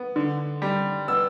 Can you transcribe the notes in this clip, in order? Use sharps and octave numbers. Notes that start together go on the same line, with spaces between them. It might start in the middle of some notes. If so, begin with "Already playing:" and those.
Already playing: B3
D3
G3
B3 E6